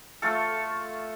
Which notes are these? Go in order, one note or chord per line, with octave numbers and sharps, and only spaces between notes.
A3 F4 A4